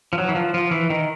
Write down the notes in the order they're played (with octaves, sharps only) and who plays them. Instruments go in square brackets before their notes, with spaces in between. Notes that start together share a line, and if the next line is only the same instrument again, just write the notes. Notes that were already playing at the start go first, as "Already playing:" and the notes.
[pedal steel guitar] F3
F#3
E3
F3
F3
E3
D#3